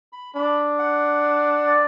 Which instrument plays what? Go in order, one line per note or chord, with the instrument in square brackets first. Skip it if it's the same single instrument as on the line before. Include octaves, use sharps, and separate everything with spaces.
[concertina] B5
[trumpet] D4 [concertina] B5
[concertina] F#5
D5